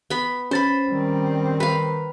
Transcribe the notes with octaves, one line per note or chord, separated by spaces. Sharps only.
B3 B5
C#4 C5 B5 A6
D#3 G3 C4
B4 F5